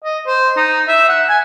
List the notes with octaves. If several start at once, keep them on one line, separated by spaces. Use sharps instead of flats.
D#5
C5
D#4
E5
F#5
G#5